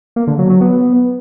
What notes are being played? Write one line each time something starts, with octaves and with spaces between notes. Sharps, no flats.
A#3
D3
F#3
F#3
B3